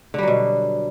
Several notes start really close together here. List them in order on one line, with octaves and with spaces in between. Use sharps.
D3 G3 F#3 B2